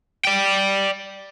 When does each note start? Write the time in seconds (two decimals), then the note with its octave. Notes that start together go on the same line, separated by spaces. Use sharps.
0.25 D5 G5